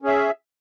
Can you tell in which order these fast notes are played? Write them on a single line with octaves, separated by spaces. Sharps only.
C#4 G#4 E5